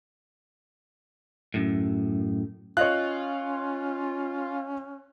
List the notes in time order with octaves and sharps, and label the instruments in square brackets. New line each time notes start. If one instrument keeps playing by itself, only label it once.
[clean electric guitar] F#2 A2
[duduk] C#4 [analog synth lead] F4 [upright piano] C#5 D#5 F5 [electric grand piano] F#6